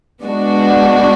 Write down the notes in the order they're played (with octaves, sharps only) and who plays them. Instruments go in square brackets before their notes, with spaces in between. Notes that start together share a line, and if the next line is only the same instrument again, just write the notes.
[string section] G#3 B3 D4 F#4